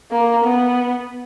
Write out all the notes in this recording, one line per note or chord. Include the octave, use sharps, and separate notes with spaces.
A#3
B3